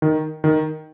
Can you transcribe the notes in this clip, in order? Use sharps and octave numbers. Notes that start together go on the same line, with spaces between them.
D#3
D#3